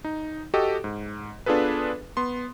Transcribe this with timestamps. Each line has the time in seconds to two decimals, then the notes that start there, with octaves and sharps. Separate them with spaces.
0.04 D#4
0.54 F#4 G4 A4 D#5
0.84 G#2
1.46 B3 D4 F4 G#4 A4 B4
2.17 B3 C6